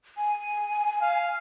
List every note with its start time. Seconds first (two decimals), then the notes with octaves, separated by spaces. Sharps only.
0.17 G#5
1.02 F5